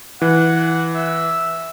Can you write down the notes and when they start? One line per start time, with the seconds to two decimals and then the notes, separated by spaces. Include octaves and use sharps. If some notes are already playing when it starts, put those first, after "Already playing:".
0.22 E3 F#5
0.94 E5